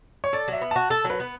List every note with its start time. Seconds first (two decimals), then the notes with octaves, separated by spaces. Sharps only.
0.24 C#5
0.33 A4 D5
0.48 F#3 E5
0.61 B3
0.71 F#4 A5
0.90 A4 A5
1.04 F#3
1.10 B4
1.20 B3